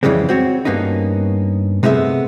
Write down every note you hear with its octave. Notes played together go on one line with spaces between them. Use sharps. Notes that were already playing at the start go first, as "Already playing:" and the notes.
F2 C#3 E3 G3 G#3 C4
C4 F#4 C#5
G2 A#3 B3 C#4 D#4
C3 G#3 A3 B3 B4 E5